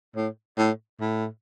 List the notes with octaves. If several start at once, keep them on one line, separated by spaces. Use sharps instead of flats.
A2
A2
A2